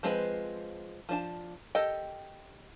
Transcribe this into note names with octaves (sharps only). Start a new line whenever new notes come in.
F3 G#3 C4 E4 B4
F3 D4 A5
G4 A4 A#4 D#5 G5